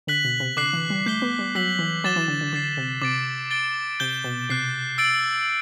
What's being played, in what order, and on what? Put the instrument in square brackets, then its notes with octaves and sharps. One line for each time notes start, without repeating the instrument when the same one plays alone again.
[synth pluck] D3 [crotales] F#6 B6 F#7
[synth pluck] B2
C3
[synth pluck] D3 [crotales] D6 F#6 C7 F#7
[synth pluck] E3
G3
[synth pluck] A3 [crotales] G6 C7 G7
[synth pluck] B3
G3
[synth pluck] F#3 [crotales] E6 B6 F#7
[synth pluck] E3
[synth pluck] F#3 [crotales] D6 A6 E7 G7
[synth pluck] E3
D3
D3
[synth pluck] D3 [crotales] D6 A6 C7
[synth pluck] C3
[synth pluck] C3 [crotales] D6 A6 D7
[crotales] A6 D7 G7
[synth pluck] C3 [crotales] G6 D7 G7
[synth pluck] B2
[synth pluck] C3 [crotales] F#6 C7 G7
[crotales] E6 A6 D7 F#7